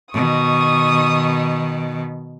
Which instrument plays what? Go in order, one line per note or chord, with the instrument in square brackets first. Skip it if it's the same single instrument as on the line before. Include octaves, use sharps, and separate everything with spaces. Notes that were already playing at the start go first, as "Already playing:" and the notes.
[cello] B2 D#3 [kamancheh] C#6 D#6